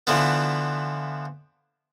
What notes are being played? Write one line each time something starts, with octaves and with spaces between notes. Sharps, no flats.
D3 E3 F3 B3